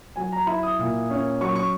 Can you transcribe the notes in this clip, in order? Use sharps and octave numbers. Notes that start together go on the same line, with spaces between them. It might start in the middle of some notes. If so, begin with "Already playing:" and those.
F#3 G#5
A#5
E4 B5
D#6
A#2
C#4
F#3 C#6
C#6